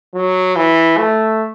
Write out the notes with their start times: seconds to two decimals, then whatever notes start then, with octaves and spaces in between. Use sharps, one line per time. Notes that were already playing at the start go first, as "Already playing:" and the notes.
0.14 F#3
0.56 E3
0.98 A3